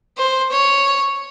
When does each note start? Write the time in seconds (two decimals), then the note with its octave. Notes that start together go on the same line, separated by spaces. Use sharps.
0.18 C5
0.51 C#5